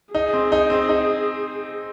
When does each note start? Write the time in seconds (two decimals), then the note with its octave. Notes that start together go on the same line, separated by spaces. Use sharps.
0.14 D#4 G#4
0.33 C4
0.52 D#4
0.70 C4
0.89 D#4